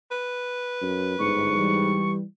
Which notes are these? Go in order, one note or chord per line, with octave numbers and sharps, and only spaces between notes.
B4
F#2
G1 G#2 C#6
E3 G3